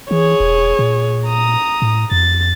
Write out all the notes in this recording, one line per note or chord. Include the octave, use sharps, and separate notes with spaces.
E3 G#4 C#5
E1
A#2
A#5 D#6
A2
F2 A6